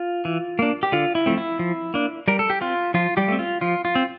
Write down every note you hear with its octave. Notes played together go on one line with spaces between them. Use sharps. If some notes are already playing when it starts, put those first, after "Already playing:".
Already playing: F4
E3
A#3 D4
G4
D3 F4
E4
F3 A3 C4
E4
F3
A#3 D4
G3 A#4
A4
G4
C4 F4
F3 F4
G3 G4
A3 C4
F4
F3 F4
F4
C4